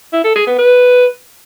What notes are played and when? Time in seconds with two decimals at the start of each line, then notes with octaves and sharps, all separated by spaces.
0.13 E4
0.24 A4
0.36 G#4
0.47 B3
0.58 B4